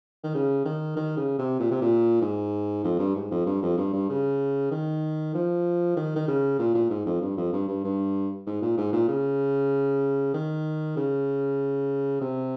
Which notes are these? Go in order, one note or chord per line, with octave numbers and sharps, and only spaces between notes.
D#3
C#3
D#3
D#3
C#3
C3
A#2
C3
A#2
G#2
F2
G2
G#2
F2
G2
F2
G2
G2
C#3
D#3
F3
D#3
D#3
C#3
A#2
A#2
G#2
F2
G2
F2
G2
G2
G2
G#2
A#2
G#2
A#2
C#3
D#3
C#3
C3